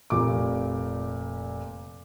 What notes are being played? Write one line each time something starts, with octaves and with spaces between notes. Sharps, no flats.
F1 A#2 D6